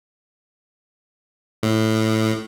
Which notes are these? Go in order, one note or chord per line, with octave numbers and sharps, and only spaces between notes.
A2